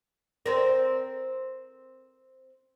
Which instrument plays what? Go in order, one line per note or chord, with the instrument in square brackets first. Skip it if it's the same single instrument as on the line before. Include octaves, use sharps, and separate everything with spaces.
[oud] C4 A#4